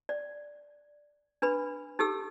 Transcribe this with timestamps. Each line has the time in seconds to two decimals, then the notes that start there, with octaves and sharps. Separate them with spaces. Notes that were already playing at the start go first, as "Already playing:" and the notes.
0.09 D5
1.42 D4 B4 B5
1.99 D#4 G4 A4 E6